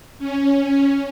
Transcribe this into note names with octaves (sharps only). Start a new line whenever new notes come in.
C#4